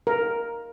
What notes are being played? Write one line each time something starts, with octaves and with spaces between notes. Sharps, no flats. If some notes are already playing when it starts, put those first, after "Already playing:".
A#4